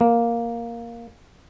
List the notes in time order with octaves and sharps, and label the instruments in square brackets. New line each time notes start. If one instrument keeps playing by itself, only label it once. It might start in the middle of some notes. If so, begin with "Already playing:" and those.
[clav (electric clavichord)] A#3